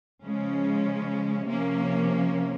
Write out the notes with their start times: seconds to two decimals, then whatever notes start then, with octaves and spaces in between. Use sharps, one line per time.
0.23 C#3 F3 G#3 C#4
1.46 C3 F3 A#3 C#4